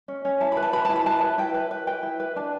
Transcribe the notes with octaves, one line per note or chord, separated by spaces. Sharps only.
C#4
C#4
E4 A5
B4 B5
A5
B4 B5
E4 A5
B5
B4 A5
B4
E4 G5
B4
B4
B4 G5
E4
B4
D4 A5